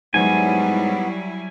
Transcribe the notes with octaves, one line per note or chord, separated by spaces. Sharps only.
G#2 F#3 G3 B3 E4 G#5